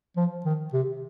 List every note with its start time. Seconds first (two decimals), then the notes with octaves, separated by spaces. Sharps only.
0.17 F3
0.45 D#3
0.73 C3